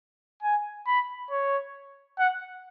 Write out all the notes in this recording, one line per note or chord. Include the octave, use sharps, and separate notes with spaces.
G#5
B5
C#5
F#5